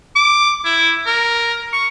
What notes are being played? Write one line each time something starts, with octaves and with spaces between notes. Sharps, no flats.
D6
E4
A#4
C#6